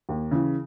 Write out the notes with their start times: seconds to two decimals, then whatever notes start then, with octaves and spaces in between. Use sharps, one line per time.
0.09 D#2
0.31 C#3 E3